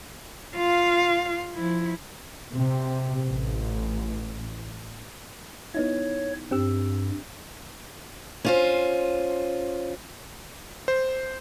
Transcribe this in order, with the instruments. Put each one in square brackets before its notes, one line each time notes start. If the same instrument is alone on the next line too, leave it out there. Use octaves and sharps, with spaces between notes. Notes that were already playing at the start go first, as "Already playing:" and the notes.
[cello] F4 F5
F3 E4
[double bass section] C3
A1
[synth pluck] B3 D#4 E4 [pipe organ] C#5
[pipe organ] G2 [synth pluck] C4 G4 E6
[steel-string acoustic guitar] C#4 F4 C5
[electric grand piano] C5